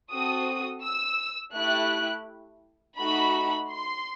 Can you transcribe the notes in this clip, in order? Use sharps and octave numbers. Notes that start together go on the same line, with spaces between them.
C4 F#4 A4 D#6
E6
A3 E4 G4 F#6
A3 D#4 F#4 B5
C6